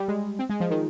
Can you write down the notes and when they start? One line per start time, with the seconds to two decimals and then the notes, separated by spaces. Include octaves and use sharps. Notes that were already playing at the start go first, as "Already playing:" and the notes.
Already playing: G3
0.08 G#3
0.39 C4
0.49 G#3
0.60 F3
0.71 D#3